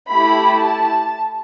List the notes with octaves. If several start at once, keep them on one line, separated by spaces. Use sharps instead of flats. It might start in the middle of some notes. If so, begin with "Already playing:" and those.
A3 E4 G4 B5
A5